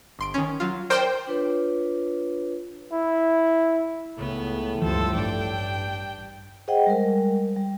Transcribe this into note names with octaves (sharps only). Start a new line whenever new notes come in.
G1 C6 D7
D#3 C#4
F#3 F4
A#4 C5 D5 G5 C6
D4 F4 B4 C#5
E4
C#2 A2 C#3 B3
C#2 G2 E3 F3 A4 C5
A1 G2 D4 G5
G#4 C5 D#5 F#5 G5
G3 G#3 A#4
G3